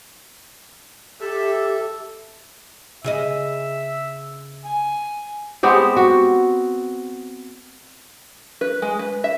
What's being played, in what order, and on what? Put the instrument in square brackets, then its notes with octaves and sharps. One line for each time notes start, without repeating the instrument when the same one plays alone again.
[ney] G4 [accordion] A4 E5
[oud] C#3 G#4 D#5 [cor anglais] E5
[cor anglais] G#5
[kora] G#3 B3 C4 G4
F#4
[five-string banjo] B4
G#3
B4
E5